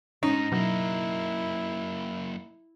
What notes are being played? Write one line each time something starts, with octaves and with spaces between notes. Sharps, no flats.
F2 G#2 C#4 D#4
F#2 B2 F#3 A#3 E4